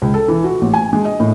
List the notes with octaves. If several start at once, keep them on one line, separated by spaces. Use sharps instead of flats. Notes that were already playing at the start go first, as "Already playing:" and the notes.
C#2
A4
E3
F#4
A1
G#5
G#3
D#5
A2